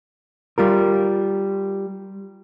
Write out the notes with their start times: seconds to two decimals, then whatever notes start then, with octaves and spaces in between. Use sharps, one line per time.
0.58 G3 F4 A#4